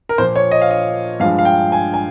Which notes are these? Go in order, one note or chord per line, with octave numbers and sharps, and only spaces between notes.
A#4
A#2 F3 A#3 C5
C#5
D#5
F5
D#5
G2 F3 G#3 F5
F5
G5
G#5
G#5